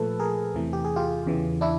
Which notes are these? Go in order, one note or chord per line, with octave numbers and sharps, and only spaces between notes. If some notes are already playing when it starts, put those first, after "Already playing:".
Already playing: A#2 F3 A3 A4 B4
G#4 A#4
E2 C3 E3 A3
G4
G#4
F4 G4
E2 C#3 E3
D4 E4